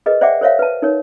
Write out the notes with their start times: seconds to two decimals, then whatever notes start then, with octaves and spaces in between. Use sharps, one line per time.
0.06 G#4 A#4 B4 D#5
0.21 C5 D5 E5 F#5 G5 D6
0.41 A#4 C5 C#5 E5 F5
0.59 B4 A5
0.82 D#4 A#4 C#5